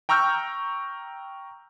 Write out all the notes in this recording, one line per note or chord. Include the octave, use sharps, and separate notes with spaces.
G5 A#5 C#6 E6 F6 G6